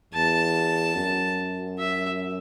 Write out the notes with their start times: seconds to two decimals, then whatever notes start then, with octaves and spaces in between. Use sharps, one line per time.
0.14 E2 A5
0.96 F#2
1.79 E5